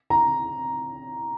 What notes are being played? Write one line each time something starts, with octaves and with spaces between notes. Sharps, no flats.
A#5